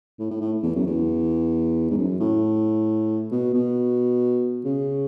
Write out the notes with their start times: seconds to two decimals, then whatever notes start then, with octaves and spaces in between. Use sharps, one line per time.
0.19 A2
0.31 A2
0.41 A2
0.63 E2
0.75 F#2
0.86 E2
1.90 G#2
1.97 F#2
2.20 A2
3.31 B2
3.54 B2
4.65 C#3